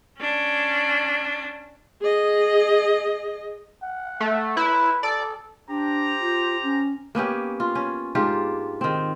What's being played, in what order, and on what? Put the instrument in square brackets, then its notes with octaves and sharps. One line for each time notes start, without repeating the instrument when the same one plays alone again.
[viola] C#4 D4
G#4 D#5
[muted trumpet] F#5
[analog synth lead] A3
[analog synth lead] E4 [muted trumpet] B4
[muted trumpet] A4 [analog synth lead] D5
[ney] D4 [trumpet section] G4 C5 A#5
[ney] F4
C#4
[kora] A#3 B3 C#4 G4
F4
C#4
G#2 D4 F4 G4
D#3 C4